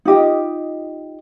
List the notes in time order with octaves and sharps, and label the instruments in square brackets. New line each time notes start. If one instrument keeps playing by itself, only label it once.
[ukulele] D#4 F4 G4 D#5